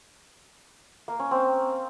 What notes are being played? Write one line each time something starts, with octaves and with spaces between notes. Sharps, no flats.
A#3
C#4
C4